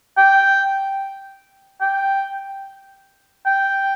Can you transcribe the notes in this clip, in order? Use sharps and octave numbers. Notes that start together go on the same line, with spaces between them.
G5
G5
G5